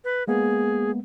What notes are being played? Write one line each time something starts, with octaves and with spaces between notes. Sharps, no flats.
B4
G#3 A#3 B3 G#4